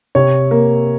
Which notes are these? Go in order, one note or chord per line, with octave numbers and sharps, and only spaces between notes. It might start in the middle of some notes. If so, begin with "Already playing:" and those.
C3 C#5
A#3